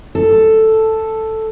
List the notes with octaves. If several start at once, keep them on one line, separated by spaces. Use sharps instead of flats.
A4